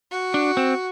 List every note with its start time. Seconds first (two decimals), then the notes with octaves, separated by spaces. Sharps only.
0.11 F#4
0.34 D4
0.57 C4